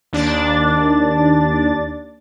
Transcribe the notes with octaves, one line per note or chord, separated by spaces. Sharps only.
D#2 D4 D5 A6